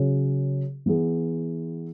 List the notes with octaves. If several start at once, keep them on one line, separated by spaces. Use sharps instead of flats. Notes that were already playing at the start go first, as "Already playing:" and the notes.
Already playing: C#3 F#3 C#4 G#4
E3 B3 E4 G#4